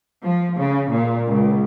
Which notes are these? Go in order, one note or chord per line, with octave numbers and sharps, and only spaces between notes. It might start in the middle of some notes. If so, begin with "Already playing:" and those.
F3
C#3
A#2
C#2